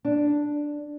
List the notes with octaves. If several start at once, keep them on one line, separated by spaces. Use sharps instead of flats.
D4